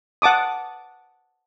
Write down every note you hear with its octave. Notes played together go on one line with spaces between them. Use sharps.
F#5 A5 D6 D#6